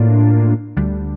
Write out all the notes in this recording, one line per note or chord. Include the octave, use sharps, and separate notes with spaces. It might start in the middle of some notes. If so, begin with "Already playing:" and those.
Already playing: A2 A#3 D4 F4
D2 D3 G3 D4